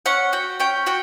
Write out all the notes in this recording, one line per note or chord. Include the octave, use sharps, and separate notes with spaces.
C#4 F#5
F#4 G5
C#4 G5
F#4 G5